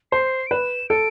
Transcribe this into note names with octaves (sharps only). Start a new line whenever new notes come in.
C5 C7
D7
B4 E7
A4 D7